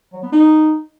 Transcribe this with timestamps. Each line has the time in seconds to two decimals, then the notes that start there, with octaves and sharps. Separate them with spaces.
0.13 F#3
0.23 B3
0.32 D#4